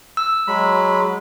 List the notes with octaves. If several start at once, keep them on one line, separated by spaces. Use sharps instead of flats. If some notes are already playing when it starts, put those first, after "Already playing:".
E6
F#3 G#3 B5